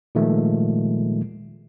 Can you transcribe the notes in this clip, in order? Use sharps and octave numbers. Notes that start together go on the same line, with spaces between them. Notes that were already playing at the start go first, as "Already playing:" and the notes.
A#2 D#3 F3 G#3 A3